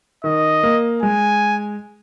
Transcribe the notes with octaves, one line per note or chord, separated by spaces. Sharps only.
D#3 D#5
A#3
G#3 G#5